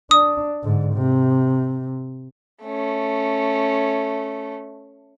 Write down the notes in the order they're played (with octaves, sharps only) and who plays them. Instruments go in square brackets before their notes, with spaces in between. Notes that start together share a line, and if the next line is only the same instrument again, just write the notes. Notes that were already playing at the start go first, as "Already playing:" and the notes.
[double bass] D4 [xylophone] D#6
[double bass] G#2 D3
C3
[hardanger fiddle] A3 C#4